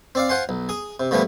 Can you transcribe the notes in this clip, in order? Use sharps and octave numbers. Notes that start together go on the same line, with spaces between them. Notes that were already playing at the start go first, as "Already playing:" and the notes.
C4 D5 F5
F4 C5 F#5 G#5 C6
B1
G#4 D#6
C3
A#2 D3 F3 G3 A3 B3